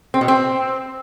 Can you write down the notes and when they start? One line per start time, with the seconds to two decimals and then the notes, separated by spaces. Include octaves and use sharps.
0.14 C4
0.21 B2
0.28 C4